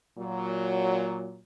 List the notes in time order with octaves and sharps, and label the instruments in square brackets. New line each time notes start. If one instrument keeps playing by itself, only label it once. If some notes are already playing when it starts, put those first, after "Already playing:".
[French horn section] A#2 F#3